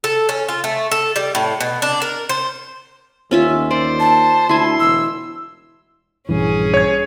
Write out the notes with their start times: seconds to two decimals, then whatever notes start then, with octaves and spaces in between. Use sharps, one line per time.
0.04 A4
0.29 C#4
0.49 F4
0.64 A3
0.91 A4
1.16 G3
1.35 A2
1.60 B2
1.82 D4
2.02 A#4
2.29 C5
3.31 D#2 C#4 F4 E5
3.71 C5 D5
4.00 A5
4.49 D2 E4 G#5 C6
4.80 E1 E6
6.29 A#1 G2 E3 C#4 G#4
6.74 C#5 G#6